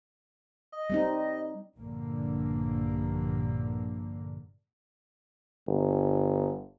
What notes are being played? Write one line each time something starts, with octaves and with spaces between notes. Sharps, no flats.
D#5
G3 C4 D#4
A#1 G2 D3 A#3
G1